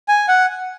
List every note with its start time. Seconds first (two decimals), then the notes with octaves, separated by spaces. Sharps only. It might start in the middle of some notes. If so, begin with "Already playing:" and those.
0.08 G#5
0.28 F#5